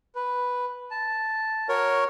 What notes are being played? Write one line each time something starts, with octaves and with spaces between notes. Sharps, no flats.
B4
A5
F#4 A#4 C#5